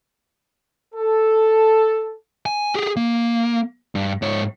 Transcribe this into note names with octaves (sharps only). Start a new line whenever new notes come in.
A4
G#5
G4 G#4
A#3
G2
G#2 C#5